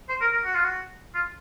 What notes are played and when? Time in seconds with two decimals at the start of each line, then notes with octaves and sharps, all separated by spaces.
0.09 C5
0.21 A#4
0.33 A#4
0.44 F#4
0.54 F4
0.64 F#4
1.15 F4